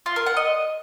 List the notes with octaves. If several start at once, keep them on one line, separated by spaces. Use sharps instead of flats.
F4
A#4
F#5
D#5